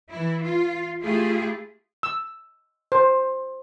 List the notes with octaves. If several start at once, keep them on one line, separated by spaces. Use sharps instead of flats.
E3 E4
F4
A3 E4 F4 G4 G#4
E6
C5